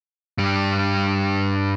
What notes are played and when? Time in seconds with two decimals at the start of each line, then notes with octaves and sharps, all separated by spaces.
0.38 G2 G3